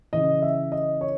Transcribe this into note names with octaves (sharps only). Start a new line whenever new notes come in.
C#3 E3 D#5
E5
D#5
C#5